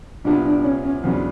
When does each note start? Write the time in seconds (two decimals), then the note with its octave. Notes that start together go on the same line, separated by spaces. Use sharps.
0.24 C2 A#2 G3 B3 D4
0.44 D4
0.60 D4
0.64 C#4
0.84 C#4
1.03 E2 C#3 F#3 B3 C4 D4